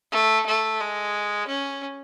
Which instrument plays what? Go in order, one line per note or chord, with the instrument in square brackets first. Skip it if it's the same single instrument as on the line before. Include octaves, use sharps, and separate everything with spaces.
[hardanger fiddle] A3
A3
G#3
C#4